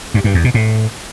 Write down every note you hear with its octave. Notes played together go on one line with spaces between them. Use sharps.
G2
G2
E2
B2
A2